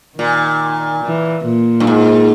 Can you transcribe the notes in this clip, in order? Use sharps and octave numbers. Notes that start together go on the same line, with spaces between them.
A#2 D#3
E3
A#2
G2
G#2